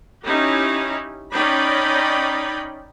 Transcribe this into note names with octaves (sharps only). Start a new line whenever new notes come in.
C#4 D#4 E4 G4
C#4 D#4 D5 G5 B5